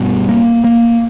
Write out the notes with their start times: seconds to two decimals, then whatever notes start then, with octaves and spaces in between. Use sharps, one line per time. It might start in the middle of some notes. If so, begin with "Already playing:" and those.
Already playing: G2 B2
0.29 A#3
0.64 A#3